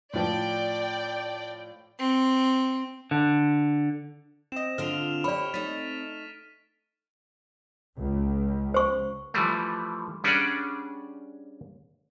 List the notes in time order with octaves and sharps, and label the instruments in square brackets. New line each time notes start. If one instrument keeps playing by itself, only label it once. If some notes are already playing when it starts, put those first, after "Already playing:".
[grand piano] A2 F3 [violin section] D5 G5
[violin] C4
[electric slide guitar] D3
[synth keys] C4 D#5 [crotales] E7
[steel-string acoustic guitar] D3 F4 [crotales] F6 D7 F7
[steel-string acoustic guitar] G4 C#5 [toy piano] D5 B5
[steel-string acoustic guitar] A3 D#4 [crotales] A6 B6 D#7
[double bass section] C#2
[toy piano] C5 C#6
[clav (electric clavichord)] E3 F3 G3 A3
G3 C#4 D4 G#4 D5 F#5